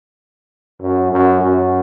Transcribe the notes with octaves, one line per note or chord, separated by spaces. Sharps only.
F#2
F#2
F#2